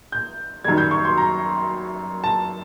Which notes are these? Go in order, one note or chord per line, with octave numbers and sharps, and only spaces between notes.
G6
F#2 D#3 G3 G#6
G6
C#6
C6
A#5
A5